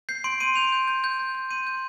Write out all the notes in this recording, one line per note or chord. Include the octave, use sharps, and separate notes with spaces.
G6 C7
C6 D7
C6 D#7
G6 F7
G6
G6
G6
G6
G6
C6 D#7
G6